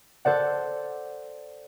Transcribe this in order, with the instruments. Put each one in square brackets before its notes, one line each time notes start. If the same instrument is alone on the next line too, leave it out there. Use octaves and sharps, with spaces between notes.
[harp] A4 C5 D5 F#5